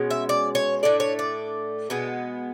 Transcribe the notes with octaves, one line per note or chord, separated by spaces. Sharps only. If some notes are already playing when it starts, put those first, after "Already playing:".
Already playing: B2 G#3 C#4
E5
D5
C#5
A2 E3 A3 D4 D5
C#5
D5
B2 G#3 B3